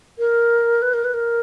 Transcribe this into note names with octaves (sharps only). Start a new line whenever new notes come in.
A#4
B4
A#4
B4
A#4